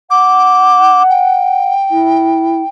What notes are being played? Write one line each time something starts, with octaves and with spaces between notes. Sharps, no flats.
F#5 D6
G5
E4